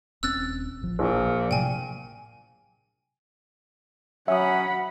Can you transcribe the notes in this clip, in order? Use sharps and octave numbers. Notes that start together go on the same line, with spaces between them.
D#1 C4 C#4 E6 F#6 A6
A1 F3
A#1 A#2
A2 C3 F#3 G5 G#5
F#3 C#4 E5 F#5 B5 D#6